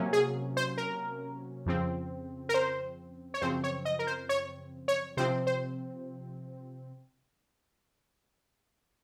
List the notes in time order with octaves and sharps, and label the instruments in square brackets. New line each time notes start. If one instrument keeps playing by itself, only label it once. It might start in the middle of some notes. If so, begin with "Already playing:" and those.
Already playing: [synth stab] C3 F#3 A#3 C#4
G#4
C5
A#4
F2 C#3 F3 C4
A#4
C5
C#5
F#2 C#3 F3 C4 C5
C#5
D#5
A#4
C5
C#5
C#5
C3 F3 C4 C5
C5